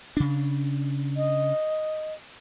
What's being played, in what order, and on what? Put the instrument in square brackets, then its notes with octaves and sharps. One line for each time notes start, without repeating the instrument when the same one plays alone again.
[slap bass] C#3 D4
[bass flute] D#5